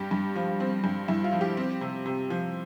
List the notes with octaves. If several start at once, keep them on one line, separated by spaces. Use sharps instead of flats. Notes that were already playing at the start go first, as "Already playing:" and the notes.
Already playing: G2 G4
G2
F3
C4
G2
G2 E4
F4
F3
G4
C4
C3
C3
F3